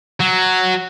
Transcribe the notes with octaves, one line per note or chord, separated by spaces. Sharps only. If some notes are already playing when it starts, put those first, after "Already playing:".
F#3